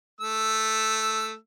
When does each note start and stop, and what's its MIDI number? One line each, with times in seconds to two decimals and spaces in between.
0.21 1.35 57
0.21 1.35 88